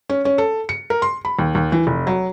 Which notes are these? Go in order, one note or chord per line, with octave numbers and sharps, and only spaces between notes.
C#4
C#4
A4
C#7
A#4
C6
B5
D#2
D#2
E3
F1
F#3